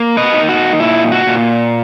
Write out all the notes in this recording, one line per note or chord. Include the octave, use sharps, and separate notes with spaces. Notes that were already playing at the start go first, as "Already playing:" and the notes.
Already playing: A#3
B4 D#5
D#4
F#4
A#2 E4
F#4
A#2